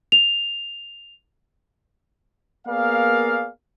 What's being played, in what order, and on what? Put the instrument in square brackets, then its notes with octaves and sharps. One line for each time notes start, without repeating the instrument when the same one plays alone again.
[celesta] F7
[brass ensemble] A#3 B3 G#4 A#4 D5 F5